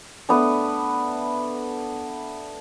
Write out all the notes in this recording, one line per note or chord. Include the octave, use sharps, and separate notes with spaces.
A3 B3 D4